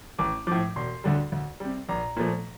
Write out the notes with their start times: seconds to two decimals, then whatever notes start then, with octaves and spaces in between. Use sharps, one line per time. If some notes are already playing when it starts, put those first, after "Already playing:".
0.19 A1 D6
0.47 A2 F3 D6
0.76 E1 C6
1.04 D2 D3 G3
1.32 D2
1.60 C3 G3
1.89 A#1 A#5
2.16 A#2 F3 A3